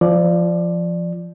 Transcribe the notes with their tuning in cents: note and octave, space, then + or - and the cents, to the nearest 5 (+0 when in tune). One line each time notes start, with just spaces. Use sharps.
F3 -15 D5 +10